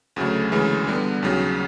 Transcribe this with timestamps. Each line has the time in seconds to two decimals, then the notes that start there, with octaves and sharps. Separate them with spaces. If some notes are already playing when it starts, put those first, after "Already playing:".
0.16 D2 C#3 F#3 A3
0.52 D2 C#3 E3 G#3
0.87 D3 G3 B3
1.23 D#2 C#3 F#3